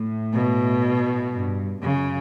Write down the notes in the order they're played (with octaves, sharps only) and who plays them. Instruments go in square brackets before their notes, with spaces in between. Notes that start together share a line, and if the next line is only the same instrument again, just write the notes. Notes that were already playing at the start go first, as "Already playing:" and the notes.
Already playing: [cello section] A2
[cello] B2
[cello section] G2
[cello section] F#2 [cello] C#3